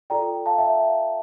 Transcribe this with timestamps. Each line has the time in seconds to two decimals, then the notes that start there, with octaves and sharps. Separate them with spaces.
0.10 F4 A4 D5 G5 A#5
0.46 F5 A5
0.58 E5 G5
0.69 E5
0.81 F5